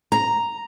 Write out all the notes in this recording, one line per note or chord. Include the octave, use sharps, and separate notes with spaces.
A#5